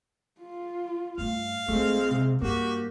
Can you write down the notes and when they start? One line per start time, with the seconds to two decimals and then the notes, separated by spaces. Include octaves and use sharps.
0.41 F4
1.18 G2 A3 F5
1.68 A#1 G#3 A3 C4 F4
2.11 C3
2.42 G2 A#3 F#4 G4